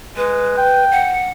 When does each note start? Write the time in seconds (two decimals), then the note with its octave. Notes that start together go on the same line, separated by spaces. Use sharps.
0.17 G#3 B4
0.57 G5
0.92 F#5